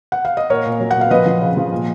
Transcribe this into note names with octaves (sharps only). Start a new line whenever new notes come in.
F#5
F5
D#5
A#2 A#4 C#5
A#2
F#3
A#2 F#5
F5
F3 B4 D#5
F3
C#3
F3
A#2